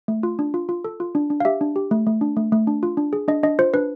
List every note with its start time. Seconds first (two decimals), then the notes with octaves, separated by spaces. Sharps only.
0.08 A3
0.23 F4
0.39 D4
0.54 F4
0.69 F4
0.84 A4
1.00 F4
1.15 D4
1.30 D4
1.40 F5
1.45 G4 E5
1.61 D4
1.76 G4
1.91 A3
2.07 A3
2.21 D4
2.37 A3
2.52 A3
2.67 D4
2.83 F4
2.97 D4
3.13 G#4
3.28 D4 D#5
3.43 D4 D#5
3.59 F4 C5
3.74 D4 B4